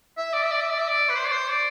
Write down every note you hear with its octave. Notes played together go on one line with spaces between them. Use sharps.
E5
D5
E5
D5
E5
D5
E5
D5
B4
C5
D5
C5
D5